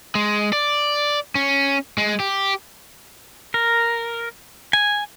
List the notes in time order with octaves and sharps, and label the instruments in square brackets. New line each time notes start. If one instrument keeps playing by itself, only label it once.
[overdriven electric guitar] G#3
D5
C#4
G#3
G4
[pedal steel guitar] A#4
G#5